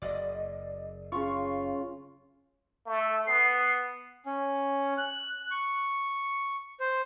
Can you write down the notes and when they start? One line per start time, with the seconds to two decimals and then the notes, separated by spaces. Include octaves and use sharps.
0.02 F#1 D5 D#5
1.12 C#3 F4 C#6
2.86 A3
3.27 B3 C7
4.26 C#4
4.98 F#6
5.51 C#6
6.80 C5